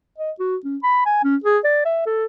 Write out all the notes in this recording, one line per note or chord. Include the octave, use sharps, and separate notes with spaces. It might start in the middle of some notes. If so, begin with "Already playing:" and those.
D#5
F#4
C#4
B5
G#5
C#4
G#4
D5
E5
A4